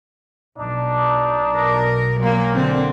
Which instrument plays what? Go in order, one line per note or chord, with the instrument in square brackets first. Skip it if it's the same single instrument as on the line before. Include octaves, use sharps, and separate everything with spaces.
[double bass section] B1 [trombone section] D4 D#4
[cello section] A#4
[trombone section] A#2 [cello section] F#3 A#3
[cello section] D3 C4